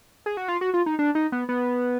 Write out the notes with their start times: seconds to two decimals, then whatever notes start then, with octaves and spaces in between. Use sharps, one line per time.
0.26 G#4
0.37 F#4
0.48 F4
0.61 F#4
0.74 F4
0.86 D#4
0.99 D4
1.15 D#4
1.32 B3
1.49 B3